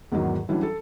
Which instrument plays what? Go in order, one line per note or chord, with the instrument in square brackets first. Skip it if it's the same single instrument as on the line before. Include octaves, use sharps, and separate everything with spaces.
[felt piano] E2 G#2 D#3 F#3
E3 F#3 G3 C#4 D4 E4
A4